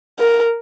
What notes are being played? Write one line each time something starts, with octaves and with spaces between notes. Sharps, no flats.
A#4